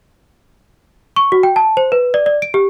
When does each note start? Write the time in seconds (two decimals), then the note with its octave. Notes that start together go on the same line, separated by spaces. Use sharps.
1.16 C#6
1.32 F#4
1.43 G5
1.56 A5
1.77 C5
1.92 B4
2.14 D5
2.26 D5
2.42 D7
2.54 G4